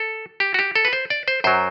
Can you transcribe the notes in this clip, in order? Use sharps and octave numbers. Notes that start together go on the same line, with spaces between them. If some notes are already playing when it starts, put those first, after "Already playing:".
Already playing: A4
G4
F#4
G4
A4
B4
C5
D5
C5
F#2 F#3 C5